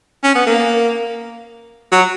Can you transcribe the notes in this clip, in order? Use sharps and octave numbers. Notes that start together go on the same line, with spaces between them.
C#4
B3
A#3
F#3